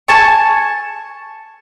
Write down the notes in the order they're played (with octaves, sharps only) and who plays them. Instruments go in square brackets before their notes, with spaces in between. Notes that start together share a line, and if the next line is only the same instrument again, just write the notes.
[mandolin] G#5 A5 C#6